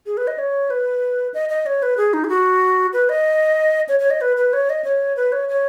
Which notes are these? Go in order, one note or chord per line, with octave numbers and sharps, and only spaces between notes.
G#4
B4
D#5
C#5
B4
D#5
D#5
C#5
B4
G#4
D#4
G#4
F#4
B4
D#5
C#5
C#5
D#5
B4
B4
C#5
D#5
C#5
B4
C#5
C#5